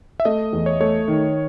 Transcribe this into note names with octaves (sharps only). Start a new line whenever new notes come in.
E5
A3 D#5
E2
C#5
A3 C#5
D#3